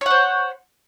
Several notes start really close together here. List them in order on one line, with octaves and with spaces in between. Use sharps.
C#5 F#5 C5